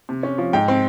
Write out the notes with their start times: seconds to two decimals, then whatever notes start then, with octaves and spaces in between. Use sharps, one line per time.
0.09 C3
0.23 C#4
0.38 F3
0.53 G#2 G5
0.68 C4